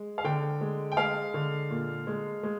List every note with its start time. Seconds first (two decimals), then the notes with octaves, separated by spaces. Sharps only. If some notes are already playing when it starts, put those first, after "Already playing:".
Already playing: G#3
0.18 F5
0.24 D3 G5
0.61 G#3
0.92 G5
0.97 G#3 F5
1.34 D3
1.70 A#2
2.07 G#3
2.43 G#3